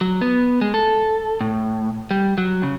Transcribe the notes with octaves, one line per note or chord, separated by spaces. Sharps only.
F#3
B3
G#3
A4
A2
G3
F#3
C#3